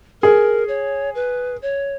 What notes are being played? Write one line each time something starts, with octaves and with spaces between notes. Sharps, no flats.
G#4 A#4
C#5
B4
C#5